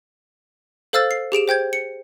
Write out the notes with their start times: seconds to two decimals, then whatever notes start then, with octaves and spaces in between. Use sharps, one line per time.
0.93 A4 C5 F5 E6 F6 A6
1.11 C7
1.32 G4 G#4 D7 E7
1.48 C5 G5 G6 G#6
1.73 C#7